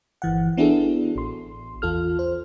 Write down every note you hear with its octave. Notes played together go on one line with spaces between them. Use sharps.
G1 E3 F#5
B3 D4 E4 F#4 G#4 A4
A1 C6
E2 F4 A4 F6
C5